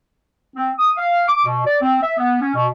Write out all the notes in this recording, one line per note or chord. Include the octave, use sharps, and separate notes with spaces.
C4
D#6
F5
D6
B2
D5
C4
E5
B3
C#4
B2